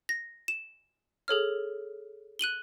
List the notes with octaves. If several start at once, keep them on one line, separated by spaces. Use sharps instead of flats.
A#6
E7
G#4 A4 C#5 F6
F#6 D#7 F#7 G7